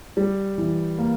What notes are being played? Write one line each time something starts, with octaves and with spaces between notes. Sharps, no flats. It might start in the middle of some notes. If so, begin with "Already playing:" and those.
G3
E3
A#3